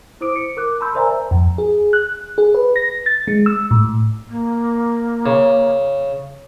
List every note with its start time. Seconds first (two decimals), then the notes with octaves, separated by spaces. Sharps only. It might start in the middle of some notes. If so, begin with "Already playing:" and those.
0.21 E4 C5 D6 D#6 D7
0.36 C#7
0.57 A#4 D6 F#6
0.80 A5 B5 C6 E6 G6
0.94 A#4 C5 D5 E5 G#5 A#5
1.31 F2
1.58 G#4
1.93 F#6
2.38 G#4
2.54 B4
2.76 A#6
3.06 A6
3.28 G#3
3.46 E6
3.71 A2
4.29 A#3
5.26 C#3